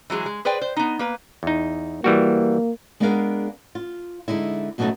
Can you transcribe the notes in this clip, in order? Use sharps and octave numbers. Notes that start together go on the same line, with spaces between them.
E3 F#3 G#3 G#4
G#3
G#4 B4 C5 D5 G5
C5
B3 D#4
A#3 B4
E2 D#4
E3 G3 A#3 F#4
G#3 B3 D4 G#4 A#4 F5
F4
D3 G#3 D#4 E4
F#2 B2 F#3 G#3 A3 D#4